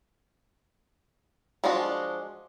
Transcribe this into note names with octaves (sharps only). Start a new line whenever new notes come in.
F3 G#3 D4 F4 F#4